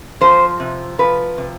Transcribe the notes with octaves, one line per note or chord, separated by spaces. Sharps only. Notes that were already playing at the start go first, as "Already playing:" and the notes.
F3 C5
C3
F3 B4
C3